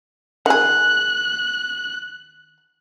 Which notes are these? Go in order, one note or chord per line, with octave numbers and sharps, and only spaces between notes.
D#3 G#4 F#6